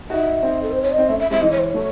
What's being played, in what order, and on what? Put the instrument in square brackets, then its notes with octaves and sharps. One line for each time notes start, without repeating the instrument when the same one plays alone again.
[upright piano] D#4 F#4 [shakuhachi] E5
[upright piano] C4 D#4
[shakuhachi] A4
C5
C#5
D#5
[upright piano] C4
[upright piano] A3 C#4 [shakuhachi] E5
[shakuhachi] E5
[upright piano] G#3 C4 [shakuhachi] E5
[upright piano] E3 G#3 [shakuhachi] D#5
[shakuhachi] C#5
C5
C#5
[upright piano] F#3 A3